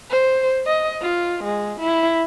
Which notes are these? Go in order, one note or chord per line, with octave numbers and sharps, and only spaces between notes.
C5
D#5
F4
G#3
E4